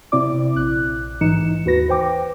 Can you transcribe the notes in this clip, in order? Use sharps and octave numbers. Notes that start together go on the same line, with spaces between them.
C3 C4 E4 D5 D6
A#1 F#6
G#2 E3 D#4 C#7 E7
D#2 F#4 B4 A#6
B4 C5 G5 D6